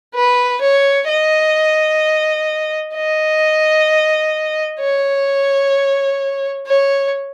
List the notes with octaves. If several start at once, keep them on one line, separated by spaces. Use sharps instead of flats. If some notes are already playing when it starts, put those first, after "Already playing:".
B4
C#5
D#5
D#5
C#5
C#5